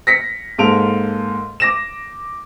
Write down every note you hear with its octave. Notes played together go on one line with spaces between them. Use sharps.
A#6 B6 C#7
G#2 A#3 A4 D7 F7
D6 A#6 E7